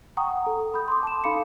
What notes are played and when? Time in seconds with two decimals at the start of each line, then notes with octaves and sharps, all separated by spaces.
0.17 F#5 G5 A#5 C#6 D#6
0.47 A4
0.74 B5 D#6 G6
0.88 C6 D6
1.03 A5 E7
1.24 D#4 A4 F5 B5 D6 C#7